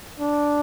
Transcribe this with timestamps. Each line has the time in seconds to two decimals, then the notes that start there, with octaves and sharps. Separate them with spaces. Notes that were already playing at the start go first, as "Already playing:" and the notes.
0.20 D4